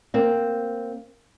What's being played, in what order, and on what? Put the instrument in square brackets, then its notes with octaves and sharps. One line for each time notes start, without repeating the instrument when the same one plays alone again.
[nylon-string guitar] A#3 C4